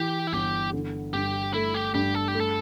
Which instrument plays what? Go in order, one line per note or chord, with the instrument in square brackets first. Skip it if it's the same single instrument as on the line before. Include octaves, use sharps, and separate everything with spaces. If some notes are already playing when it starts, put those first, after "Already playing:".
Already playing: [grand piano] E3 [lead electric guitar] G4
[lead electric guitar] E4
[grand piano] G1 [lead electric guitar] G4
[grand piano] D3
[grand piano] G2 [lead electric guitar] G4
[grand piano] A3 [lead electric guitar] E4
[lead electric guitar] G4
[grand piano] G2 [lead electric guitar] G4
[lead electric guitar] A4
G4
[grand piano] A3
[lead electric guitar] A4